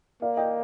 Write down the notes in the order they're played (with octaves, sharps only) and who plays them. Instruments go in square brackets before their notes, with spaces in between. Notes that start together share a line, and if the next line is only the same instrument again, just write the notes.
[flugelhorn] A#3 [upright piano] D5 F5
[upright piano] D#5 G5